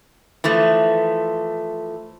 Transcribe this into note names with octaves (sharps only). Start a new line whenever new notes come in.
E3 F3 A3